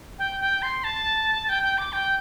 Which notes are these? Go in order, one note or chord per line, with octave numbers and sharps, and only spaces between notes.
G5
G5
C6
A5
G5
G5
D6
G5